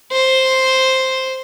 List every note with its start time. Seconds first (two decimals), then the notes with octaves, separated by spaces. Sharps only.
0.12 C5